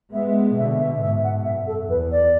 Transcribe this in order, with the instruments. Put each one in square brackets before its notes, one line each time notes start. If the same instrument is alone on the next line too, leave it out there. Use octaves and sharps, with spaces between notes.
[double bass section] G#3 B3 [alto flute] E5
[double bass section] B2 D3 [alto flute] E5
[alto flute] E5
[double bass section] G#2 B2 [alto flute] E5
[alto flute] F#5
[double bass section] F#2 [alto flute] E5
[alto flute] A4
[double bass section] E2 [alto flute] B4
[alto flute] D5